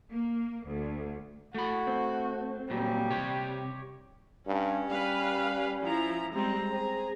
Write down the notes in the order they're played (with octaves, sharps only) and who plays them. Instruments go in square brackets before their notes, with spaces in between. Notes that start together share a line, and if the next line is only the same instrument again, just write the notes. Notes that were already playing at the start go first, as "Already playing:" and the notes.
[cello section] A#3
D2
[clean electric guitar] A3 B5 [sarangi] F#4
[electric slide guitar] C4
[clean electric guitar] A#2 F#3 [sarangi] G3
[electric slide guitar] C3 [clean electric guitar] G4 C#5
[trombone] G2 [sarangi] C#4
[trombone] G3 [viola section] B4 F5
[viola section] F3 E4 A#5
[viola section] G3 G#3 C4 [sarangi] A#5
[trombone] C4 [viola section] G#4